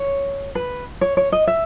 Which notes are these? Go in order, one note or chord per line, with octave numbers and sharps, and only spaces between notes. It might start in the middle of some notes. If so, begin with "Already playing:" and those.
Already playing: C#5
B4
C#5
C#5
D#5
E5